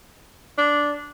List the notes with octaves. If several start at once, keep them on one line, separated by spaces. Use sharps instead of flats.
D4